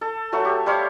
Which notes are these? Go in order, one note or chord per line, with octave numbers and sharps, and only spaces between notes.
A4
F#3 A3 A4 C#6
G4
G3 C5 C#5 F5